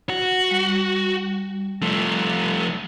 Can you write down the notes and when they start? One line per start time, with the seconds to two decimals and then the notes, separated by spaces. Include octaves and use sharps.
0.10 F#4
0.51 G3
1.82 F3 A3